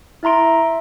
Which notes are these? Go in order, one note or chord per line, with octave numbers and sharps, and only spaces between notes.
E4 E5 A#5 C6 D7
E5